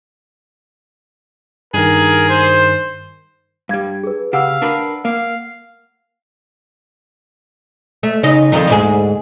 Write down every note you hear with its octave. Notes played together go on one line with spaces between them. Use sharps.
G2 D#3 G#4 A#4
C5
G2 G3 F5 G#6
G#4 B4
C#3 G4 F5 F#5 E6
D4 A#4 B4
A#3 F5
A3
C#3 D#4 D#5
F2 D#3 D#4
D2 G#2 G#4